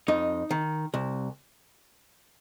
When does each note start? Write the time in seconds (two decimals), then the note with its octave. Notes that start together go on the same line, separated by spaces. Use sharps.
0.08 F2 D#4
0.51 D#3
0.94 C2